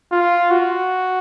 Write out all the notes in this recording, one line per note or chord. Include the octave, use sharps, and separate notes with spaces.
F4
F#4